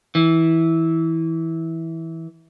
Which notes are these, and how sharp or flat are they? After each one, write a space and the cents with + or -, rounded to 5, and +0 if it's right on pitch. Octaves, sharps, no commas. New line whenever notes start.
E3 -15